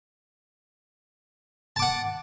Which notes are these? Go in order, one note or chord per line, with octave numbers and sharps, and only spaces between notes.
F#5 A5 D6